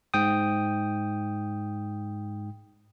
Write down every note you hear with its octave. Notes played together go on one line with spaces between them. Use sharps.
G#2 G5 D#6